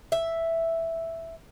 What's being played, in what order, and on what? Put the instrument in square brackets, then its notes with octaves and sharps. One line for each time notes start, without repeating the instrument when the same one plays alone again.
[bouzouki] E5